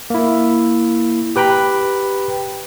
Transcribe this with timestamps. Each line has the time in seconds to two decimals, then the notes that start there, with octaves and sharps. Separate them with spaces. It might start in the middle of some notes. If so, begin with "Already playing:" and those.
0.10 A#3 E4
1.36 G4 B4 G5 A#5 B5